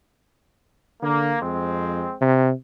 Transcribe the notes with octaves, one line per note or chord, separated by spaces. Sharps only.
D3 A#3
F2 G#3 C4
C3